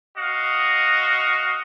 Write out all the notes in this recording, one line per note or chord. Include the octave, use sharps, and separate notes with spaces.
F#4 D#5 F5